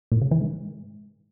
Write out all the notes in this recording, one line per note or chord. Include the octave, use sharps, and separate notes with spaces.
A#2
C#3
E3
G#2